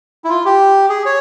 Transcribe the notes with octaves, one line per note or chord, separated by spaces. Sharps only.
E4
F4
G4
G#4
C#5